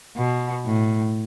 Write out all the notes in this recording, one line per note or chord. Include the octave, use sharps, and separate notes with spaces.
B2
A2